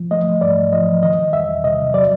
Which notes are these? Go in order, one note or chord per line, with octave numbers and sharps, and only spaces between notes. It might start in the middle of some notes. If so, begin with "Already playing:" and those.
Already playing: F3
A3 D#5
G#2 D5
F3 D#5
D#3 D#5
E2 E5
C3 D#5
F#3 D5